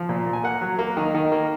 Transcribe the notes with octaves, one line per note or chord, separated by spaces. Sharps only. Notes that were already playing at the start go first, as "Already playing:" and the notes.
Already playing: F3
A#2
A#2
G#5
A#3 F#5
F#3
A#3
D#3
D#3
A#3